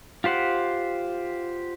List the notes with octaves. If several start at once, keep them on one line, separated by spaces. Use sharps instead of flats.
F4 G4 C5 F#5